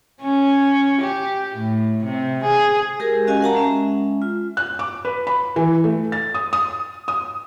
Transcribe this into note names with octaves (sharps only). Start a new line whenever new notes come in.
C#4
G4
A2
C3
G#4
G#3 G4 G#4 A#4
C#4 F#4 G4 D#5 F5 G#5
A#4 F#5 A5 A#5
G#3 C#4 E5
F4
F#6
D6
B4
B5
E3
A3
A6
D#6
D#6
D#6